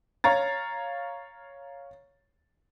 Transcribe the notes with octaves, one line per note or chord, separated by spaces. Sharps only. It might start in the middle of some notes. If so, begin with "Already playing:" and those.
C#5 F5 A#5 A6